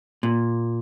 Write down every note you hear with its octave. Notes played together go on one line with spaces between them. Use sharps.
A#2